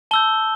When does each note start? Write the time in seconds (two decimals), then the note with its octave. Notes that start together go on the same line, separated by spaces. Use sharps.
0.11 A5 E6 G6 G7